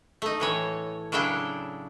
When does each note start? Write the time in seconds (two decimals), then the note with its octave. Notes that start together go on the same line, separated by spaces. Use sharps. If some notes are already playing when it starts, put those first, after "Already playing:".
0.22 A3 D#4
0.40 A2 E3 C#5
1.12 C#3 F#3 D4 E4 G5